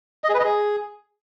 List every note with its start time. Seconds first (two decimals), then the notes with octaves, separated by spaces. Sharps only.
0.24 D#5
0.29 G#4
0.34 B4
0.39 D#5
0.45 G#4